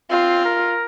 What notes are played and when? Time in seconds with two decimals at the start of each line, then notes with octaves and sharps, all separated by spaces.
0.10 C4 F4
0.45 A#4